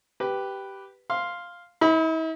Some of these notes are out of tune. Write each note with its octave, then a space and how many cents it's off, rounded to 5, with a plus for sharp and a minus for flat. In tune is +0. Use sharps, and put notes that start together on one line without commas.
G4 -5 B4 +0
F5 +0 C6 +0
E4 -45 B5 +0